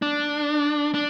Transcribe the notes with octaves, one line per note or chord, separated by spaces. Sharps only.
D4
D4